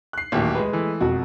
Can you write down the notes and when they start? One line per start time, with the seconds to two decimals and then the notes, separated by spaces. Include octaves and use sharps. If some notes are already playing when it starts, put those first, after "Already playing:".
0.13 F#6 C7
0.32 A1 D#2 A#2 F#3 G4
0.55 G#3 B4
0.73 E3 A3
1.01 E1 F2 F#4